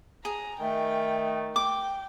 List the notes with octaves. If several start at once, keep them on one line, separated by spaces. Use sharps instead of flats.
G#4 A#5
D#3 A3 G5
G5 D6